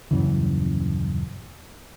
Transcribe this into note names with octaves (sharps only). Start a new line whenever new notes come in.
D#1 F#2 C#3 E3